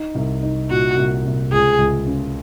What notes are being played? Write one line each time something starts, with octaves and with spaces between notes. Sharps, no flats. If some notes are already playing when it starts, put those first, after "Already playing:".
Already playing: D#4
C2
D#4
A#2 F#4
C2
C2
C#2 G#4
C#2
C#3